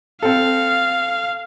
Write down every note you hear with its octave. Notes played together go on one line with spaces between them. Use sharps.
C4 A4 F5